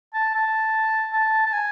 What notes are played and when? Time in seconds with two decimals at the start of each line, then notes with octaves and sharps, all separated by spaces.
0.14 A5
0.34 A5
1.13 A5
1.46 A5
1.53 G#5